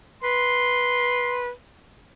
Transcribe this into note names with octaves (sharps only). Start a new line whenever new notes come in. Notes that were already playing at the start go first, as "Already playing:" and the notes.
B4 C6